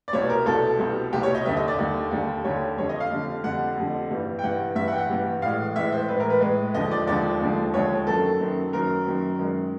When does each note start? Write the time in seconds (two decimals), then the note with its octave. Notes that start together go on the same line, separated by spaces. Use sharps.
0.08 D5
0.13 C2 B2 G3 C#5
0.29 A#4
0.46 C2 B2 G3 A4
0.79 C2 B2 G3
1.13 C2 B2 G3 G4
1.23 C#5
1.35 D#5
1.46 D#2 D3 G3 E5
1.57 D#5
1.68 D5
1.78 D#2 D3 G3
2.11 D#2 D3 G3
2.44 D#2 D3 G3 C#5
2.77 F2 D3 G3 C#5
2.89 D#5
3.00 F5
3.10 F2 D3 G3
3.43 F2 D3 G3 F#5
3.77 F2 D3 G3
4.10 G2 E3 G3
4.39 G5
4.43 G2 E3 G3 F#5
4.75 G2 E3 G3 E5
4.88 F#5
4.93 G5
4.98 F#5
5.10 G2 E3 G3
5.42 A2 E3 G#3 F5
5.76 A2 E3 G#3 E5
5.92 C5
6.08 A2 E3 G#3 B4
6.20 A#4
6.30 B4
6.41 A2 E3 G#3 B4
6.74 D#2 D3 F3 G#3 D#5
6.91 D5
7.07 D#2 D3 F3 G#3 D5
7.41 D#2 D3 F3 G#3
7.74 D#2 D3 F3 G#3 C#5
8.07 F#2 D#3 F#3 A4
8.40 F#2 D#3 F#3
8.73 F#2 D#3 F#3 A#4
9.05 F#2 D#3 F#3
9.39 F#2 D#3 G#3